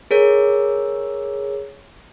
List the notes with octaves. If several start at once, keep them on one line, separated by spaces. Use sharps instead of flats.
G#4 A#4 C#5